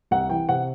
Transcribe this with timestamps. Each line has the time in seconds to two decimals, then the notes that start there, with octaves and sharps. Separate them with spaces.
0.11 C2 F#5
0.30 E3 G5
0.49 C3 F#5